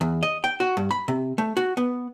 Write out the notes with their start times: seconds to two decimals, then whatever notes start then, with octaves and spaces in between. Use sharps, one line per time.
0.01 E2
0.23 D#5
0.44 G5
0.60 F#4
0.77 G2
0.91 B5
1.08 C3
1.38 A3
1.57 F#4
1.77 B3